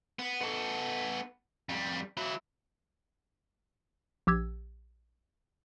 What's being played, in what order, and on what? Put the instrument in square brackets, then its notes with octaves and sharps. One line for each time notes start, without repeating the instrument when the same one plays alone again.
[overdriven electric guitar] B3
B3 A4
F2 G3
F#3 E4
[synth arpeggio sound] A#1 G4 E6 G#6